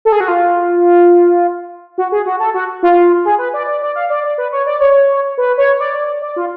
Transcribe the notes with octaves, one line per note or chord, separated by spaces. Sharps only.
A4
G#4
F#4
F4
F#4
G#4
F#4
A4
F#4
F4
G#4
B4
D5
D5
D5
F5
D5
D5
B4
C#5
D5
C#5
B4
C#5
D5
D5
D5
F4